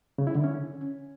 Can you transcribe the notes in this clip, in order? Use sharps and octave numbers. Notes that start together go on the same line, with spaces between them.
C#3
E4
D3
C#4